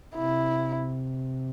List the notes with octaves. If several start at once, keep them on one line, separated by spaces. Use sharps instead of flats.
C3 E4